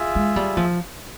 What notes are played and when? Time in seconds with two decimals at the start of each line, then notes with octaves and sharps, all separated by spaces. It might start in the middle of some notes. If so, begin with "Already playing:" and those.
Already playing: F4 G#4 E5
0.15 G#3
0.36 G3
0.57 F3